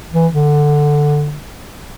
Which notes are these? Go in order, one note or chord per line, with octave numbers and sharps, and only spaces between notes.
E3
D3